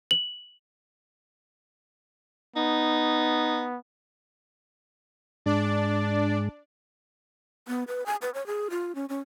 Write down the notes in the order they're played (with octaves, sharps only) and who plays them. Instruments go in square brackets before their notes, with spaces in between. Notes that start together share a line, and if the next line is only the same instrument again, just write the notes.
[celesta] F#7
[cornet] B3 [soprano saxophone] D#4
[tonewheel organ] G#2 G#3 [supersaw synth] D4 D5
[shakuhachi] B3
B4
G#5
B4
C#5
G#4
F4
C#4
C#4